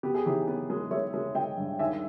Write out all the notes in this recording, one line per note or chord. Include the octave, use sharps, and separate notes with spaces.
B3 G4
G#4
E3 D#4 G4
B3
G#3
G#3 C#5 E5
G#3
G#3 D#5 G5
G2
D#2 E5 G#5